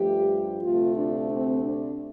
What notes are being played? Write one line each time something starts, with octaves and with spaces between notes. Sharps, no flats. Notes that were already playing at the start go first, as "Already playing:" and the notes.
Already playing: G2 F3 A3 G4
D2 C3 A3 F4
D4
C4
D4